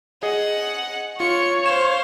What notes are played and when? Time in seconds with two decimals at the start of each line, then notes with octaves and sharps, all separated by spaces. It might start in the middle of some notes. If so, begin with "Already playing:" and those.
0.23 G#4 D#5 F#5
1.20 F4 C#5 C#7
1.66 C5 F5 E7